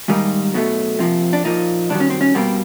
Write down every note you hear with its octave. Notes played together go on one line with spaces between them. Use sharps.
G#2 D#3 G3 A#3 D#4
B2 F#3 A3
C3 F3 A#3
D4
A#2 F3 A#3 D#4
G2 D#3 F#3 D4
C#4
C4
C#4
B2 G3 A#3 C4